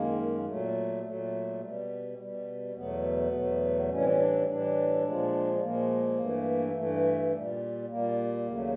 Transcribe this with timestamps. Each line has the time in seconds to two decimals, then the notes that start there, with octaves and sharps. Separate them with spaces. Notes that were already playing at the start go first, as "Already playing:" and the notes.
Already playing: F#2 D#3 G#3 A#3
0.46 A#2 F#3 A3
1.04 A#2 F#3 A3
1.60 B2 G3
2.17 B2 G3
2.75 E2 B2 F#3 A3 B3
3.32 E2 B2 F#3 A3
3.89 A2 E3 G3 C#4
4.00 C4
4.09 C#4
4.18 D4
4.46 A2 E3 G3 D4
5.04 A#2 F3 G#3
5.61 A#2 F3 G#3 A#3
6.18 G2 E3 A3
6.75 G2 E3 A3
7.32 A#2 G3
7.89 A#2 G3 A#3
8.46 D#2 C#3 F#3 A3